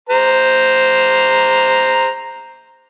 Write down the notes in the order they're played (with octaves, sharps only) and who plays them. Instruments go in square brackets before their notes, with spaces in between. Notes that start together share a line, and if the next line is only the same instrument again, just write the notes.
[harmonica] C5 A#5